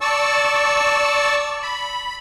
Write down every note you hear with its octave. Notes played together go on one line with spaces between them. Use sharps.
D5 A5 C#6 E6
B5